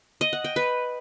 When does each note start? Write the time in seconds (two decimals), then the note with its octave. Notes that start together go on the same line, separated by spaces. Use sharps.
0.21 D#5
0.33 F#5
0.44 G5
0.56 B4